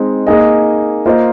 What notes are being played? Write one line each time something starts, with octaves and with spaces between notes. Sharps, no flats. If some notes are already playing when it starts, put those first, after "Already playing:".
Already playing: G#3 C4 D#4
A#3 D#4 G#4 D#5
A#3 F4 C5 D#5